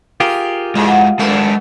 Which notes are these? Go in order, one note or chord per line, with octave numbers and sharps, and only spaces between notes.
F4 G4 G#4 A#4
G#2 G#3 E4
F#2 G#3 A3 A#4